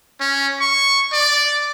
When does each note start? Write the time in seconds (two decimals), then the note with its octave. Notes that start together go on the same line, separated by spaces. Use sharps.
0.20 C#4
0.60 C#6
1.12 D5